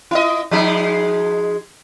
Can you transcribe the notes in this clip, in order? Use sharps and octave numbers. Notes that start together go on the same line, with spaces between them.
E4 D#5
F3 G#3 D#4